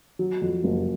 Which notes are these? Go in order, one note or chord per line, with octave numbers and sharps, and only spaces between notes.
F#3
F2
F#1